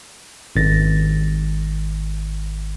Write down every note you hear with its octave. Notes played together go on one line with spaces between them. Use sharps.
G#1 A6 A#6